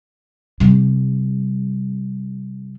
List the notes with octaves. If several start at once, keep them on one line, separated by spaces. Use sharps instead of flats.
C3 G3